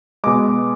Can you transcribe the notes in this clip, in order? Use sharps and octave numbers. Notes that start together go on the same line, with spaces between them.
B2 G#3 D6